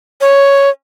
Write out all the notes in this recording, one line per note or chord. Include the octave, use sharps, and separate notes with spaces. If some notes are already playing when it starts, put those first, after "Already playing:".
C#5